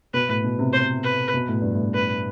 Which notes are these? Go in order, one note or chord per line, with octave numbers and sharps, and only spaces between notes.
B2 B4
A2
B2
C3
C5
B4
B2
A2
G2
A2
B4